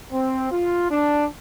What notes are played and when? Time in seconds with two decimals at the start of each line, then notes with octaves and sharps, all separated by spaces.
0.12 C4
0.52 F4
0.90 D4